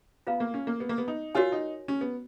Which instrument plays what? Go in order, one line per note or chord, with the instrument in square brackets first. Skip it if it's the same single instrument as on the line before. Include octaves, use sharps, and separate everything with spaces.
[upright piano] B3 [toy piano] F4 B4 F5 A#5
[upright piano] A#3
C#4
A#3
B3
A#3
B3
D#4
[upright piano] F4 [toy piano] F#4 A#4 C#5 G#5
[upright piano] D#4
C#4
B3